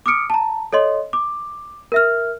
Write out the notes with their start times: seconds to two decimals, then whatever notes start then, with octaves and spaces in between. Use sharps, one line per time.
0.06 D6 D#6 F6 C#7 D7
0.30 A5 A#5
0.73 A4 C#5 D#5 C6
1.13 D6
1.92 A#4 E5 F6